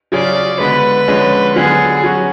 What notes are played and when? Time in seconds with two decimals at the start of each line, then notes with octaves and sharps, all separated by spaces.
0.12 C#3 F#3 C#4 F4 G#4 D5
0.60 D3 G#3 B3 B4
1.08 D3 F3 G#3 C#4
1.56 D3 F#3 B3 F4 G#4
2.03 F#3 C#4 F#4